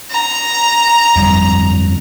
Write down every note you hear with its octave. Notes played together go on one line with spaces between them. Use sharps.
A#5
G1 F2 G3